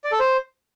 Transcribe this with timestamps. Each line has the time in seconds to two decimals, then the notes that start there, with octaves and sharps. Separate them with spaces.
0.04 D5
0.12 A4
0.19 C5